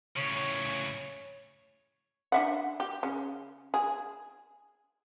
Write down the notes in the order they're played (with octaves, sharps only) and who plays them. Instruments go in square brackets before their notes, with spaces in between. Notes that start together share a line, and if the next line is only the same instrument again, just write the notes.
[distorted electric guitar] A2 C#3 [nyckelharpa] C#5
[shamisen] D4 E5 F#5
G4
C#3
G#4